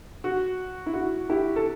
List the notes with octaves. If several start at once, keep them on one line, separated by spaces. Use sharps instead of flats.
F#4
E4
F#4
E4 G4
A4